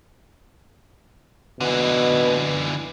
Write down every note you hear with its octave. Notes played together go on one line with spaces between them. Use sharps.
B2 D3 E3